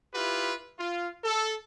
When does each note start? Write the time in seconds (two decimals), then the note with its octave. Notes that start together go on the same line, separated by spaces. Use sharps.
0.14 E4 F4 G4 B4
0.79 F4
1.24 A4